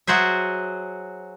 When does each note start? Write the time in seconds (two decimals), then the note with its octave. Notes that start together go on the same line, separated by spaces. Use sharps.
0.07 F#3 F#4 G#4 C5 E5